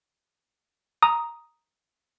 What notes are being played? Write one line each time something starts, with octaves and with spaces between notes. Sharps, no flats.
A#5 D#6